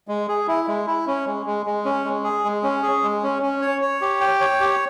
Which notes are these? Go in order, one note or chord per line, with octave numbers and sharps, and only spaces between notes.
G#3
G#4
E4
G#3
E4
C#4
G#3
G#3
G#3
C#4
G#3
G#4
G#3
C#4
G#4
G#3
C#4
C#4
C#5
C#5
G4
G5
C#5
G4